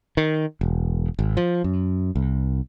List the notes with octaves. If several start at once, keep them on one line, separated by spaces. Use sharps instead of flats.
D#3
E1
G#1
F3
F#2
C2